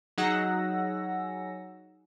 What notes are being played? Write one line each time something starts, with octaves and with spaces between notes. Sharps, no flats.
F#3 D#4 G#4 F#5 E6 A#6